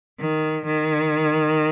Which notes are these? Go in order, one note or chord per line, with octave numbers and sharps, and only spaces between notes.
D#3
D#3